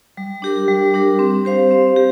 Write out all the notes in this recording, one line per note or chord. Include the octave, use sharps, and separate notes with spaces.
G3
D4 G4 A#4
G3
D4 G4 A#4
C4
G4 C5 F5
C4
G4